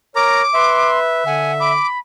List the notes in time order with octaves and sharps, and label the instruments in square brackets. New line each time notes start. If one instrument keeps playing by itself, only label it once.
[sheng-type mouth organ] A#4 A#5 [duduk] C#5 [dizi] D6
[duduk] B4 [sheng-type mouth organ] E5 [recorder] C6
[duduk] D3 [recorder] F#5 [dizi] G#5
[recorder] B5 [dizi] D6